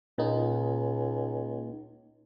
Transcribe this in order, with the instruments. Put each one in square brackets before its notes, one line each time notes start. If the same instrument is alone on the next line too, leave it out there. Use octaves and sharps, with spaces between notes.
[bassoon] C#2 [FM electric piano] A#2 A#3 D#4